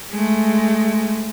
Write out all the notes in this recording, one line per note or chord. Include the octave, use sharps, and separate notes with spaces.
G#3 A3